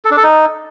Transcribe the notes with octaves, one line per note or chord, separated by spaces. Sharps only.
A4
D4
A4
D#4